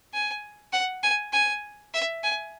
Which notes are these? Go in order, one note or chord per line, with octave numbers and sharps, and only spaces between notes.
G#5
F#5
G#5
G#5
E5
G#5